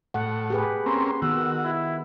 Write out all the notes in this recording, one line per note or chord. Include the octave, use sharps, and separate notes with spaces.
A2 F#5
G4 G#4 B4
A#3 C4 C#4 C6
D#3 B3 F#4 E6
E4